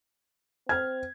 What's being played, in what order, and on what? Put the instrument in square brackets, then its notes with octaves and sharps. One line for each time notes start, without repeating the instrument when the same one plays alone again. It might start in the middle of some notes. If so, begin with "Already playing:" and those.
[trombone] C4 [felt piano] F6 G#6